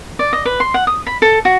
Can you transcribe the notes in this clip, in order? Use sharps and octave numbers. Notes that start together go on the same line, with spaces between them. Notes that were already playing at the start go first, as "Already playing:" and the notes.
D5
D#5
B4
C6
F#5
D#6
B5
A4
F#4